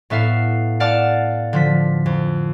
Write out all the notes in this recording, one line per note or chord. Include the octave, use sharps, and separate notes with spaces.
A2 B3 A4 E5 F5 C7
D5 F5 F#5 A5 D6
D3 F3 B6
F2